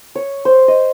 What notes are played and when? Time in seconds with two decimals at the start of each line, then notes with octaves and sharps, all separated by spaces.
0.15 C#5
0.45 C5
0.68 D#5